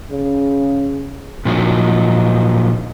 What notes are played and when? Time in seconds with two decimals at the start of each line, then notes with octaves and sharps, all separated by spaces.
0.11 C#3
1.45 A#2 F3 F#3 D#4